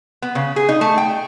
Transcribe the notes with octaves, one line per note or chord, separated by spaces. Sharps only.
B3
C#3
G#4
D#4
A3
G5